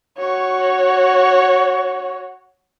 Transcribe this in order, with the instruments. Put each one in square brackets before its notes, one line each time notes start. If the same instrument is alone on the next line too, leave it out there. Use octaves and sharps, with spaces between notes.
[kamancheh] F#4 C#5